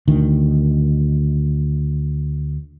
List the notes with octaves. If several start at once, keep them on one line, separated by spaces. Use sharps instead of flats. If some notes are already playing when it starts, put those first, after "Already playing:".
D2 D#3